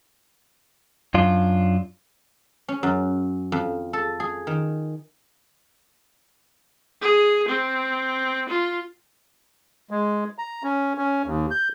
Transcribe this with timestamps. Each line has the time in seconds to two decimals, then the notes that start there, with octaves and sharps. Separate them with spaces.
1.14 F#2 D4 F4
2.68 C#4
2.83 F#2
3.52 F2
3.93 A4
4.20 G#4
4.47 D#3
7.01 G#4
7.48 C4
8.49 F4
9.90 G#3
10.38 A#5
10.63 C#4
10.98 C#4
11.26 D#2
11.51 G6